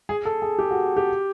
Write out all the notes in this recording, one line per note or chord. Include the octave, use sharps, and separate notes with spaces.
G#4
A4
G#4
G4
F#4
G4